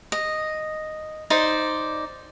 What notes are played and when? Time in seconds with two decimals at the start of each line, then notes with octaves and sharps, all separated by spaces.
0.12 D#5
1.30 D#4 C5 D5